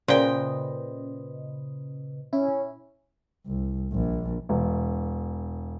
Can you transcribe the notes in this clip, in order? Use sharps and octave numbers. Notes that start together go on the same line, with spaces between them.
A#2 C#3 B4 C5 D#5 G5
C#4 E4
C2
A#1
E1